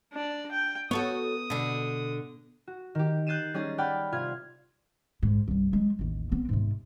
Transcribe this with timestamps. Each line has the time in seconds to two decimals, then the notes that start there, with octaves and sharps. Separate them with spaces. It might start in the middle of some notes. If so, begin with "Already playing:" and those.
0.12 D4 D5
0.52 G5
0.91 B3 F#4 A4 C#5 D#6
1.50 B2 D3
2.68 F#4
2.95 D#3 G4
3.27 F#6 G6 A6 C7 D#7 E7
3.54 G3 C#4 D#4 G#4 A6
3.78 D5 F#5 G5 B5 F6 A6
4.12 C3 F4 F5 G#6
5.23 G#2
5.48 C2 G2
5.73 F#3 G#3
5.99 A1 D#2
6.31 B3 C4
6.49 G#2 C3